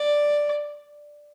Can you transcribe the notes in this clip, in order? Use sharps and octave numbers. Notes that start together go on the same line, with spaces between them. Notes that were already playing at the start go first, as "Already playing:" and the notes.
Already playing: D5